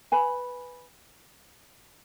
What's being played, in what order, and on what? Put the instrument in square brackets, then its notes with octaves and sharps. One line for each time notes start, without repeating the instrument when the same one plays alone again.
[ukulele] B4 G#5 B5